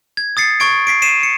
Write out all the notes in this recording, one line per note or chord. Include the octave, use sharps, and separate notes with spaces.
G#6
D#6 A6 C7 C#7
C#6 G#6 D7
B6 C7 D7
B6 C7 D#7 E7
C#7